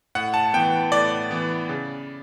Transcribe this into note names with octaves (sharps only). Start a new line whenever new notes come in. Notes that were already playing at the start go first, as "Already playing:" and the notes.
A2 F#5
A5
E3 B3 G5
A2 D5
E3 B3
C#3